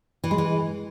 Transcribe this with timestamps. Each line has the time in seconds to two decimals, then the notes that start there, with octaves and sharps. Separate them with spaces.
0.24 E3
0.31 G#3
0.38 E3